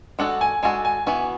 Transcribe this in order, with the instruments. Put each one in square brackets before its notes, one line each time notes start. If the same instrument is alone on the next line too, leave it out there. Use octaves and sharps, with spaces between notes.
[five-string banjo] G#3 D4 F#4 A4 [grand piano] F#5
[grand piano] G#5
[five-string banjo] G#3 D4 F#4 A4 [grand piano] G#5
[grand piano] G#5
[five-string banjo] E3 B3 F#4 B4 [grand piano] G#5